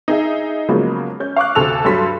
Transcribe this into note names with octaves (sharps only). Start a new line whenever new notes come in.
D#4 G#4 E5
C#3 F3 F#3 G#3 A#3 B3
C#4 G6
F5 C#6 D6 F#6
D2 C3 A4 A5 E6 F7
G2 F#3 A4 B5 C6 B6